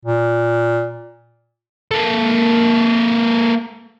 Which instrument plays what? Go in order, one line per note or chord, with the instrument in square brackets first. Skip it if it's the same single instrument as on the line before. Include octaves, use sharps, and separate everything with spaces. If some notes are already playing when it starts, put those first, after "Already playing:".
[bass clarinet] A#2
[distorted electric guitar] A#3 A4